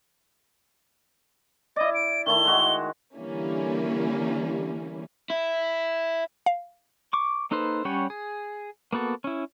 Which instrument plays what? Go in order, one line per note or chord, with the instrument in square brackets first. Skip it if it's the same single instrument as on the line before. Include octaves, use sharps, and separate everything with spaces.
[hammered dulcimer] E4 D5 [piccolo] D#5
[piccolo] D7
[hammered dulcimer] D#3 A3 E4 [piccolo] G7
[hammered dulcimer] G#3 F#4
[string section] D3 E3 G3 A#3 C#4 E4
[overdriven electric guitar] E4
[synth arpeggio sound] F5
[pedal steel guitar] C#6 D6
A#3 D#4 A4 B4 C5
G3 C#4 G4 C#5 F#5
G#4
A#3 B3 F#4 A4
C#4 E4